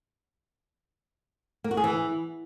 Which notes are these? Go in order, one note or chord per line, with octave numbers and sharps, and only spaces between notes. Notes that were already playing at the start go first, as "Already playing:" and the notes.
A#3
F#4
G#4
E3